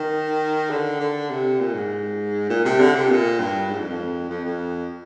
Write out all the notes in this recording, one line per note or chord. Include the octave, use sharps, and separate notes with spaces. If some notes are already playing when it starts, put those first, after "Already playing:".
Already playing: D#3
D3
D3
C3
A#2
G#2
A#2
C3
D3
C3
A#2
G2
G#2
F2
F2
F2
F2